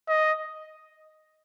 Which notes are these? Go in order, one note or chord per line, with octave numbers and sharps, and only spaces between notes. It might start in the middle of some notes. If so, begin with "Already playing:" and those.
D#5